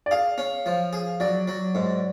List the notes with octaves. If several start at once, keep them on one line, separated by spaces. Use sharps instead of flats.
D5
G#4 F5
C#4
F3
G#4
F#3 D5
F#3
G#2